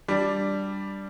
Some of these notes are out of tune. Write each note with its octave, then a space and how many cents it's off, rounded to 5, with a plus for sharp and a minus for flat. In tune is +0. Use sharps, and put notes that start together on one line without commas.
G3 +0 D4 -5